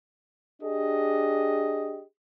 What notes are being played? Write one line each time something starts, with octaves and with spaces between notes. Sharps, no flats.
D4 G4 G#4 D#5